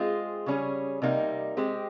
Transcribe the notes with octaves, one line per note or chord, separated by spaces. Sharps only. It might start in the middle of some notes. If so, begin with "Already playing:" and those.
Already playing: G#3 C4 F4 G#4
C#3 G3 C#4 G#4
C3 G3 A#3 D#4
G#3 C4 G4